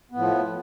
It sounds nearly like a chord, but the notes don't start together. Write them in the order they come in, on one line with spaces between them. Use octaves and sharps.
B3 A2 F3